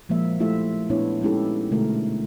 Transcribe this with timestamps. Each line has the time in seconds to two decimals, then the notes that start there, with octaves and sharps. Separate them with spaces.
0.09 A#2 F3 G#3 A#3 E5
0.40 A3 E4 F4 G4 A4 E5
0.90 A#2 B3 D4 E4 C#5
1.22 G#3 C#4 D#4 E4 G4 A4
1.71 B2 D3 G#3 A3 F#4 A#4